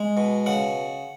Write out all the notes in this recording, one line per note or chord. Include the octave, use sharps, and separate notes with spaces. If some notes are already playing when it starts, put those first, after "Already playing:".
Already playing: G#3
B2
C#3 F#5